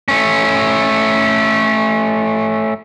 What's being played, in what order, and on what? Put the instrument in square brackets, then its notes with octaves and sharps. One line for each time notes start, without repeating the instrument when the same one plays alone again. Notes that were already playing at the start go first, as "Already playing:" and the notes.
[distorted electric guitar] A3 C#4